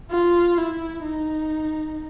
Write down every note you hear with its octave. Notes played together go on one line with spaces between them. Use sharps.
F4
E4
D#4